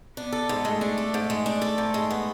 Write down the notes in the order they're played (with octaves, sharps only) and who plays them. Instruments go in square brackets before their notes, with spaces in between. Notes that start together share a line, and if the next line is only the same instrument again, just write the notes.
[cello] B3 [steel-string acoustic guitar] D4
[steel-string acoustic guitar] A4
G#2
[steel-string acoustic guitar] G#3 [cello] A3
[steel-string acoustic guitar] D4
A4
G#2
G#3
D4
A4
G#2
G#3
B3